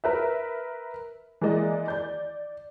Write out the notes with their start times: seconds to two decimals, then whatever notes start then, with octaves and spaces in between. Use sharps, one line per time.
0.04 A#4 B4 E5
1.41 E3 G#3 A#3 D5 D#5
1.88 D5 G6